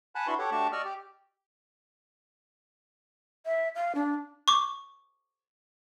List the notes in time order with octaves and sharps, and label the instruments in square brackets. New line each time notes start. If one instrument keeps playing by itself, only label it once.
[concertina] F#5 G#5 A5 B5 F#6
D4 E4 F#4 B4 C6 C#6
G4 A4 C#5 F#5
A3 D4 F#4 G4 A5 C#6
D5 D#5 C#6 E6 F6
G4
[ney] E5
F5
D4
[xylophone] C#6 D6